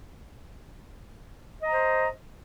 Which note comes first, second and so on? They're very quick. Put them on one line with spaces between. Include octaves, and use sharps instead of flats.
D#5 A#5 C5